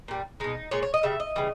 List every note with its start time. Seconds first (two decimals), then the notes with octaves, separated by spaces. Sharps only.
0.08 A#2 G3
0.40 B2 G#3 D#4
0.71 A#2 G#3 C#5
0.83 C#5
0.94 D#5
1.03 C#3 G3 E5
1.20 D#5
1.36 C#3 E3 G3